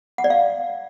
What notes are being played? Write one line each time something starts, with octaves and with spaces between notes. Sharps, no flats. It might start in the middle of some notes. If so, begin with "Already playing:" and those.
F#5
D5
F5